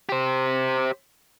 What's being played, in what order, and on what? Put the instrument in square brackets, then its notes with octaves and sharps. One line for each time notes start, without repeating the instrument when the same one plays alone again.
[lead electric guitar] G4 C5